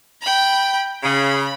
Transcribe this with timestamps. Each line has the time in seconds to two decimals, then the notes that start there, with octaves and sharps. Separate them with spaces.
0.22 G5 B5
1.03 C#3 B5